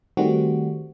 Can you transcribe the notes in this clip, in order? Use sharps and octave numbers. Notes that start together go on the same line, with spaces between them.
D#3 G3 A3 C4 F#4